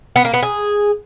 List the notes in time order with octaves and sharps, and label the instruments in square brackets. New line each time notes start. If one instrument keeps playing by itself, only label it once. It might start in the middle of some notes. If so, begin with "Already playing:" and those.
[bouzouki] B3
A#3
B3
G#4